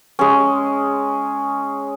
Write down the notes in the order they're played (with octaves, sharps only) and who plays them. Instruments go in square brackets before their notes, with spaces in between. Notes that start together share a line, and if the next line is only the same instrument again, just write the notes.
[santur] G#3 C#4